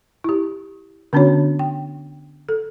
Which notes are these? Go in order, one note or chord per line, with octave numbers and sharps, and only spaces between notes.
E4 G4
D3 B3 C#4 D4 F#4 C#5
G5
A4